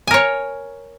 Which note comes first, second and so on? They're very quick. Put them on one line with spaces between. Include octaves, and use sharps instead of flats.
G#5 A#4 C#5